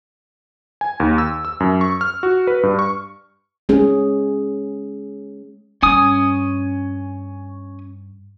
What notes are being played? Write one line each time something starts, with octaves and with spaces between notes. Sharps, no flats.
G#5
D#2
E6
E6
F#2
C#6
F6
F#4
B4
G2
C#6
G#3 C#4 G#4
G2 C#4 G#5 D#6